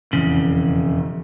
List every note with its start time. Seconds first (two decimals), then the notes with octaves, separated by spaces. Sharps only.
0.13 E1 F2 A#2 C#3 E3